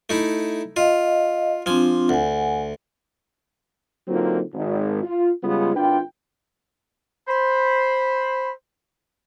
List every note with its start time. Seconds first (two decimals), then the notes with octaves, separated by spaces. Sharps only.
0.10 A3 D#4 E4
0.76 F4 D#5 F5
1.66 F3 C4 D4 F4 G#5
2.09 D2 F#5 G#5
4.08 D3 F#3 A#3 C4 D#4 F4
4.54 G#1
5.03 F4
5.43 C#3 G3 G#3 B3 F4
5.76 G#1 D4 F4 B4 G5
7.28 C5 B5